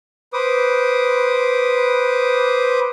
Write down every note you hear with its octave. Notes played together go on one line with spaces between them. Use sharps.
B4 C5 D6 D#6